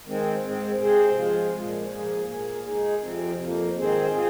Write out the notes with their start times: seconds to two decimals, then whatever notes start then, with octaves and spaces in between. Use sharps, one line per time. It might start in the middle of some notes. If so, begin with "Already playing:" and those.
0.05 D#3 G#3 C4
0.42 G#2 G#3 C4
0.79 C3 G#3 C4 G#4 C5
1.16 F3 G#3 F4
1.54 A#2 F3 G#3
1.91 G#2 F3 A#3 G#4
2.28 A#2 A#3 G#4
2.65 G#3 D#4 G#4
3.02 F2 C3 F3 C4
3.39 F2 F3 A#3
3.76 G#2 D#3 C4 G#4 C5
4.13 C4 F4 G#4